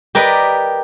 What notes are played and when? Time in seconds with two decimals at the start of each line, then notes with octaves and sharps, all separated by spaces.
0.15 G4 A#4 B4 D5 D#5